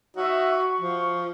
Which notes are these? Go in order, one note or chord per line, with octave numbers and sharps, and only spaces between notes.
D#4 F#4 C#5 E5
C#6
F3